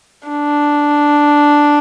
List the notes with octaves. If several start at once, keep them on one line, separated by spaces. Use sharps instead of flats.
D4